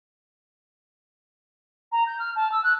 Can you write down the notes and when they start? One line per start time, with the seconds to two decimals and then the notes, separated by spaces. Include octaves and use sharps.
1.92 A#5
2.07 G6
2.19 F6
2.36 A5
2.52 E6
2.64 F#6